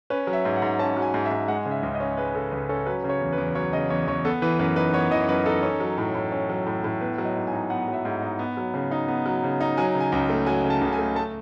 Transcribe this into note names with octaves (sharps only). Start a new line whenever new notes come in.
C#4 B4
F#3
E5
G#2
F#5
G#2
C#4 A5
F#3
G#5
G#2
E5
G#2
G#3 F#5
C#3
E5
C#2
D#5
C#4
G#3 B4
C#3 A4
C#2 B4
C#4 A4
F#3 B4
C#3
C#5
E2
B4
E2
F#3 C#5
C#3 D#5
E2 C#5
E2 C#5
B3 A4
E3 B4
F#2 B4
D#4 B4
B3 C#5
E3 D#5
F#2 B4
D#4 A4
C#4
F#3
A2
A2
C#4
F#3
A2
A2
B3 B4
F#3
D#5
G#2
G#5
D#4
B3 F#5
F#3
E5
G#2
D#4
B3
F#3
C#3
D#4
B3
F#3
C#3
D#4
F#3 G#5
C#3
G#5
C#2
A3
F#3 G#5
C#3
A5
C#2
G#5
A3
A3 A5